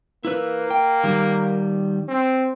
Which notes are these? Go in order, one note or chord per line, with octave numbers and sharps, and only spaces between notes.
A#3 E4 B4
G5
D#3 G3
C4